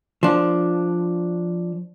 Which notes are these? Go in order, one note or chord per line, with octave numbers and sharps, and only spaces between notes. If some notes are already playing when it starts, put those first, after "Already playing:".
F3 D4